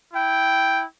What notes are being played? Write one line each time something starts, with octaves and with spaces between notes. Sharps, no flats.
E4 G5